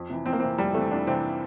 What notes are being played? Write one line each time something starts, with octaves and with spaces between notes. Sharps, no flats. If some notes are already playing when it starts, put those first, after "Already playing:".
Already playing: F2
C3 E3
F2 C4
A#3
C3 E3 C4
F2 G3
C3 E3 A3
F2 D4
C3 E3 C4